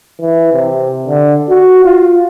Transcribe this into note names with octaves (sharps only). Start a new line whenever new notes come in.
E3
C3
D3
F#4
F4